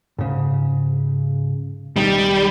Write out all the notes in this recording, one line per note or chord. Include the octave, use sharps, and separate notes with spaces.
G#2 C#3
B1 D#3 G3 D#4